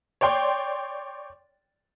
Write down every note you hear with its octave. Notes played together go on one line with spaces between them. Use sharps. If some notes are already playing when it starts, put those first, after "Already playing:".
C#5 D5 G5 C6